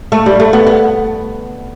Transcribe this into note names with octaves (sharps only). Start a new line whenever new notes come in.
A3
G3
A3
B3
B3